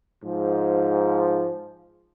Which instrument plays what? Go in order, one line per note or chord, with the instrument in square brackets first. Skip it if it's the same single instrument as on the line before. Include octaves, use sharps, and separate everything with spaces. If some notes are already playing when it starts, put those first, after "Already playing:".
[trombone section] G#2 F3